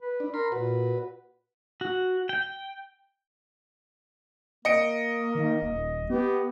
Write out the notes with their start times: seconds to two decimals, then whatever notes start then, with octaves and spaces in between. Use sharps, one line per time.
0.02 B4
0.20 D4
0.34 A#4 B5 C6
0.52 A#2 F#4 B4
1.81 F#4
2.29 G5
4.65 A#3 D#5 C#7 D7
5.35 D#3
5.62 D#1
6.10 B3 G4